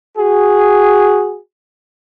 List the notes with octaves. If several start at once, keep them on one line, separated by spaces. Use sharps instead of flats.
F#4 G#4